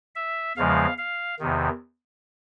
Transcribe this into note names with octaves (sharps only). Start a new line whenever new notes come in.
E5
E2 C#3 F3 G#3 F5
F5
E2 C3 D#3